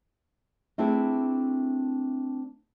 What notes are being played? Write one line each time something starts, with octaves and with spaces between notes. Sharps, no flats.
A3 C4 D4 E4 G#4 B4